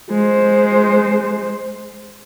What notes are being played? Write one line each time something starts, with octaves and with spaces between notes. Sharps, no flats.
G#3 C5